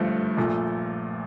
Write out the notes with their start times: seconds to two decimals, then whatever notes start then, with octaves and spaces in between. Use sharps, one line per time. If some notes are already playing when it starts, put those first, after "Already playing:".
Already playing: G1 G2 F3 A3
0.37 A#1 A#2 A3